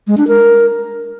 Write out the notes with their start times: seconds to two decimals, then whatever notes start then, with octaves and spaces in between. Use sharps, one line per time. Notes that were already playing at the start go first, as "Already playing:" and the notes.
0.07 G#3
0.17 D4
0.28 A#4